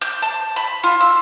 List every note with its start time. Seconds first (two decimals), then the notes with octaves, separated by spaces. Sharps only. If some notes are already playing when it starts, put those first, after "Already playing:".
0.02 G6
0.22 A5
0.56 B5
0.83 F4
1.00 E6